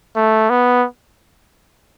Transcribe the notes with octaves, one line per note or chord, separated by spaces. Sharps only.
A3
B3